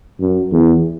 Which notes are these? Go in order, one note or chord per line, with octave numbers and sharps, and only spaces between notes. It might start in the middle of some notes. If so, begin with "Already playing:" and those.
F#2
E2